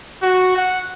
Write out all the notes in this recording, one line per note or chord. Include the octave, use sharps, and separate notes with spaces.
F#4
F#5